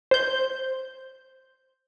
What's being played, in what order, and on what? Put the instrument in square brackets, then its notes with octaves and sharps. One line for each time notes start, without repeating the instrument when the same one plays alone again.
[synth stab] C5 G6